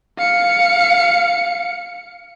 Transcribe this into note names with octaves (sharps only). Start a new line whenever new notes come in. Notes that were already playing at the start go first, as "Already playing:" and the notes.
F5 C#7